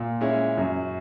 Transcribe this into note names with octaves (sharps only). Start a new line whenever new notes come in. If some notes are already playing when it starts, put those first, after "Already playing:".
Already playing: A#2
G#3 C#4 E4
F#2